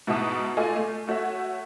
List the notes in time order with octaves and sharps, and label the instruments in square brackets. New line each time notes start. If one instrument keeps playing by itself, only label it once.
[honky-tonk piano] G#2 B2 E4 E5 A5 D#6
A3 F4 A4 D5 D#5 G#5
A3
A3 F#4 C#5 E5